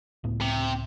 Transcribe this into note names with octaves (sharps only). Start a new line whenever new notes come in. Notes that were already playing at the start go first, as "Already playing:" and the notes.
C#2 A2 B3
C3